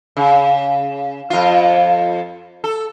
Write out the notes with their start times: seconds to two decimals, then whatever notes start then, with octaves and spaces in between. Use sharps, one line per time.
0.17 C#3
1.30 F2 F4
2.64 A4